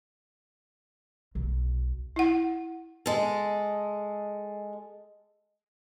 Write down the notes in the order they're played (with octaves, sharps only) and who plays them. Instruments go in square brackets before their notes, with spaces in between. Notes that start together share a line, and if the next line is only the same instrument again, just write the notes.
[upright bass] B1
[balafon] E4 F#5
[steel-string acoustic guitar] G#3 A4